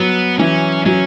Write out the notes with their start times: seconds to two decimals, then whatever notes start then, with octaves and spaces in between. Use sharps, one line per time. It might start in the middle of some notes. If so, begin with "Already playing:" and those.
Already playing: F#3 B3
0.39 E3 C#4
0.85 F#3 C#4